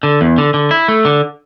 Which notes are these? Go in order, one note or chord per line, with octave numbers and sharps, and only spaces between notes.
D3
E2
D3
D3
E4
A3
D3